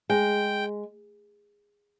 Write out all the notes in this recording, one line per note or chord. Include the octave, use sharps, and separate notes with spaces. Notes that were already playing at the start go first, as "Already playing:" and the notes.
G#3 G5